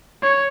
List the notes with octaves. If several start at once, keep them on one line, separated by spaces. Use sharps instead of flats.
C#5